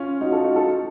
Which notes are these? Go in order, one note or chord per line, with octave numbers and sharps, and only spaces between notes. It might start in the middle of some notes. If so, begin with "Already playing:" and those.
Already playing: C#4 F4
D#4 F#4
F4 A4
D#4 F#4
F4 A4